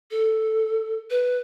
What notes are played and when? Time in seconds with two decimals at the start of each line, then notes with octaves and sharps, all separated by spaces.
0.11 A4
1.10 B4